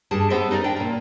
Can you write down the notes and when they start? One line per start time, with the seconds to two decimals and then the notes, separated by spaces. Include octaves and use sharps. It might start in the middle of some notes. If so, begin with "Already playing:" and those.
0.11 G2 G3 D4 G#4 A5
0.30 B3 G4 A4 C5 D#5 E5
0.51 D#4 A#4 C#5 D5
0.64 D4 G5
0.76 A#2 A#4